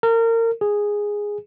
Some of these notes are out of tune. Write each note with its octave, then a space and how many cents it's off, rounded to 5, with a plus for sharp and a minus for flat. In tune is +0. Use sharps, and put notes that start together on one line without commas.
A#4 -30
G#4 -5